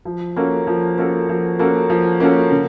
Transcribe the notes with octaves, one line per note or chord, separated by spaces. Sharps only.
F3
A#3 C#4 F#4 A4
F3
A#3 C#4 F#4 A4
F3
A#3 C#4 F#4 A4
F3
A#3 C#4 F#4 A4
C#3